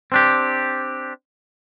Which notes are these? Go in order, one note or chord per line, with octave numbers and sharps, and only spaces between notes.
C4 D4 G4